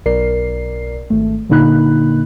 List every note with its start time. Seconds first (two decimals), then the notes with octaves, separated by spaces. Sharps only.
0.06 B1 A#4 D5 C7
1.10 G#1 A3
1.49 A#2 D3 A#3 D#4 B5 F#6